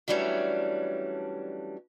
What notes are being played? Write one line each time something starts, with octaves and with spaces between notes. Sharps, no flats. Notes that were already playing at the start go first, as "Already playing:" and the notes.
E3 F#3 G3 A3 C#4 D4